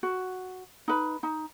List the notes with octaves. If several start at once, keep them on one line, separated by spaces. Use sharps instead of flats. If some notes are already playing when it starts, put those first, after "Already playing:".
F#4
D#4 B4
D#4